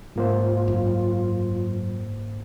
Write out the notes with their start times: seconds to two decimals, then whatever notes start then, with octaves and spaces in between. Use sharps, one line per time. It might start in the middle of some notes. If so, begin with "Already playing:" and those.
0.16 G#2 A#3 F4 C5
0.68 F#2